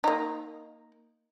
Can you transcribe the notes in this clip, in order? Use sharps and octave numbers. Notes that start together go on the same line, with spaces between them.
A#3 D#4